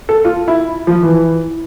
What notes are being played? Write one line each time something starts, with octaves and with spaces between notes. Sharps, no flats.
A4
F4
E4
F3
E3